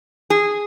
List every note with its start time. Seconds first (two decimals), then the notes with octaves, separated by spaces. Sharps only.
0.30 G#4